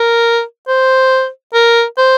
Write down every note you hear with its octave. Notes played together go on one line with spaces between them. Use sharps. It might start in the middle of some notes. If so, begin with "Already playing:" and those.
Already playing: A#4
C5
A#4
C5